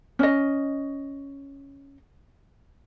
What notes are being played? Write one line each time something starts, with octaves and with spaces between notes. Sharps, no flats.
C#4 D#5